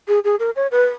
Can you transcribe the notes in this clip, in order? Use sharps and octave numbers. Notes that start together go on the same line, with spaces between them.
G#4
G#4
A#4
C#5
B4